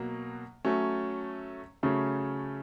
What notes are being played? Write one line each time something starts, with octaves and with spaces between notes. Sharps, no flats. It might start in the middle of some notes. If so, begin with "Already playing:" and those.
Already playing: B2 F#3 A#3
F#3 A3 C#4
C#3 F#3 A3 C#4